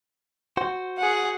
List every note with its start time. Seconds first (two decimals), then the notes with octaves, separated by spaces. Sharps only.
0.57 F#4 C5
0.98 G#4 F#5